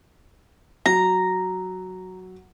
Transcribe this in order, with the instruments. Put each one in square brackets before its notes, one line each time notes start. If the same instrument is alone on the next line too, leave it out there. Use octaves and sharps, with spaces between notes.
[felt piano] F#3 [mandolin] A#5